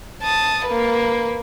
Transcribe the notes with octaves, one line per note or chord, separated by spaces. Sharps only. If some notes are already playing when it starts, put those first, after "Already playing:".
A5 D#6
A#3 B4